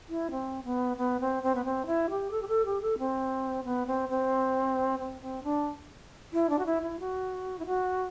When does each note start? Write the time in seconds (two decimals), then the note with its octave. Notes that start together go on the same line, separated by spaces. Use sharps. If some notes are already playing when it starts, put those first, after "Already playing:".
0.09 E4
0.31 C4
0.64 B3
0.97 B3
1.21 C4
1.43 C4
1.55 B3
1.65 C4
1.86 E4
2.10 G4
2.31 A4
2.42 G4
2.48 A4
2.66 G4
2.82 A4
2.99 C4
3.65 B3
3.87 C4
4.09 C4
4.99 C4
5.22 C4
5.44 D4
6.33 E4
6.50 D4
6.59 F#4
6.66 E4
6.82 E4
7.00 F#4
7.59 E4
7.67 F#4